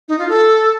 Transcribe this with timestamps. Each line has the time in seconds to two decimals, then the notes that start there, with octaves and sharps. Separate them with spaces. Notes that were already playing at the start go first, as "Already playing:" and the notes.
0.08 D#4
0.19 F4
0.29 A4